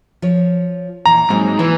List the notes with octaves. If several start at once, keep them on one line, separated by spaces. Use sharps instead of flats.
F3 C#5
A#2 E3 A#5
G#2 F#3 A#3 C4
E3 A#3 B4 E5